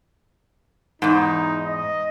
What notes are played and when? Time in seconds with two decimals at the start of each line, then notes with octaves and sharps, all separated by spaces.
1.02 E2 G#2 D#4
1.66 D#5